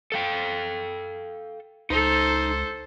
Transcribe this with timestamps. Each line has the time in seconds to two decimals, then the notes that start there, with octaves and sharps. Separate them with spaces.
0.12 A4 F5 G5
1.90 C#2 D#4 A4 C5